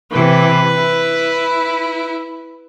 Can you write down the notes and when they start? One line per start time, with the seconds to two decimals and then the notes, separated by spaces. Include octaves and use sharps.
0.12 C3 E3 B4
0.75 E4